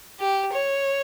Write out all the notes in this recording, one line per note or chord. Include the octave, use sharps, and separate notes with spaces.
G4
C#5